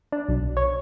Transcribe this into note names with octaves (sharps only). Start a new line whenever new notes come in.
D4
B1
C#5